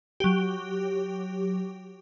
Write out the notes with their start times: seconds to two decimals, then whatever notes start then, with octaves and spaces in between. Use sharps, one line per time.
0.20 F#3 G4